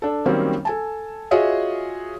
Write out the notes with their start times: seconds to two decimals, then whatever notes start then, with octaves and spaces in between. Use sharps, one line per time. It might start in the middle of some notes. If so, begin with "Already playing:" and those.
0.02 D4 A4
0.26 D#3 F#3 G3 A#3 C4 C#4
0.65 A4 G#5 A5
1.31 F4 F#4 G#4 C#5 D#5 E5